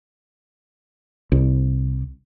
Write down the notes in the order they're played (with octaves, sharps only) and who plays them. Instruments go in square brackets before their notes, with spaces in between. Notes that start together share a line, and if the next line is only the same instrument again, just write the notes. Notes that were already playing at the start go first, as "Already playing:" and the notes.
[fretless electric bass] C2